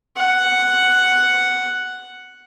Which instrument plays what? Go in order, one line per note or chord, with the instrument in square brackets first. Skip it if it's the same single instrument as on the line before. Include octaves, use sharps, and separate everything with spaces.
[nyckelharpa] F#5